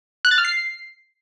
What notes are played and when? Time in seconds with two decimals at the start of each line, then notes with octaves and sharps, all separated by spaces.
0.25 F#6
0.31 A6
0.38 F6
0.45 C7